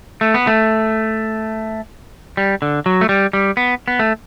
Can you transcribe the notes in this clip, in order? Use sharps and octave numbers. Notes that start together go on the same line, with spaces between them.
A3
B3
A3
G3
D3
F#3
A3
G3
G3
B3
B3
A3